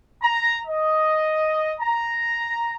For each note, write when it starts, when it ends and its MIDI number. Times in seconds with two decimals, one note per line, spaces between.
0.22 0.55 82
0.67 1.72 75
1.79 2.75 82